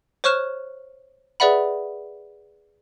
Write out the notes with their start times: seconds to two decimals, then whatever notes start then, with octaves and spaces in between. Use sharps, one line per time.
0.24 C5 C#5 C#6 F6 F#6 E7
1.40 G#4 B4 D5 E5 F#5 B5